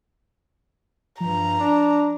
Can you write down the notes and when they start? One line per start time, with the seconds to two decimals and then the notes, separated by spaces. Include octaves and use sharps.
1.20 G2 F3 A#5
1.59 D4